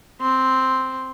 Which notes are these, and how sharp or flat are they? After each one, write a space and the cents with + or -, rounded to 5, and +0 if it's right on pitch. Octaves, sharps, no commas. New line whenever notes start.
C4 +0 C6 +0